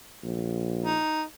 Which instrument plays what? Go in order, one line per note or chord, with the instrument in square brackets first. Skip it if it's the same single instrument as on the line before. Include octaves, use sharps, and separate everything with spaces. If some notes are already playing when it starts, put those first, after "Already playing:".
[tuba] A#1
[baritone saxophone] D#4